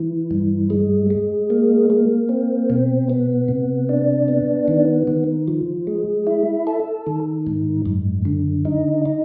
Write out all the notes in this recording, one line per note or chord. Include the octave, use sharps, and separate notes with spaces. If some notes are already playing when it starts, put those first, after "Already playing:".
Already playing: E3
G2
G#3
G#3
A#3
A#3
C4
B2
B3
C3
D4
B3
D#3
D#3
F3
G#3
E4
A4
D#3
G#2
F#2
D3
D#4
D#4